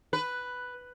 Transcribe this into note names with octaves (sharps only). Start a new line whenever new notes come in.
B4